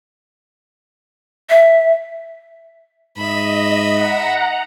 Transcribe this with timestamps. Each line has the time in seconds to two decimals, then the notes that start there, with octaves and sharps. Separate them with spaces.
1.50 E5
3.18 G#2 D#5 E5 B5
3.93 F#5 A#5